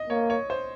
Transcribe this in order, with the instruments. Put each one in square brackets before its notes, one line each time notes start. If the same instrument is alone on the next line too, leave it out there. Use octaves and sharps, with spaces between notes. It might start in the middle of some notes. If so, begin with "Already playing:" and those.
Already playing: [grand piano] D#5
[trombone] A#3 [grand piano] C#5
[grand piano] C#5
C5